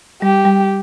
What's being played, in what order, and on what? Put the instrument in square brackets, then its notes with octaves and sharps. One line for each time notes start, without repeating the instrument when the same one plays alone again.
[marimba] G3 [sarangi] G4
[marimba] G3